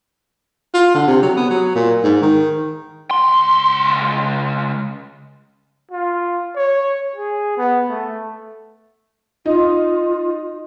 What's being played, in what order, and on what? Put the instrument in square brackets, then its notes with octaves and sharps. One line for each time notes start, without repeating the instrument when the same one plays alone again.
[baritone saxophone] F4
D3
C3
F#3
B3
F#3
A#2
G#2
D#3
[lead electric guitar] C#2 C6
[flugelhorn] F4
C#5
G#4
B3
A3
[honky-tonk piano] D#4 [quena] F4